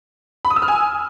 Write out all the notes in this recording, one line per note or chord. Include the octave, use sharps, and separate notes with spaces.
B5
D#6
E6
F6
G#5